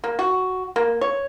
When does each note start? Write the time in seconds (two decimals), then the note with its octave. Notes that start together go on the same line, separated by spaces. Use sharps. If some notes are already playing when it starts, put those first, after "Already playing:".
0.04 A#3
0.19 F#4
0.76 A#3
1.01 C#5